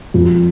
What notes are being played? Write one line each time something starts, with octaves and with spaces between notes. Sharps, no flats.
F2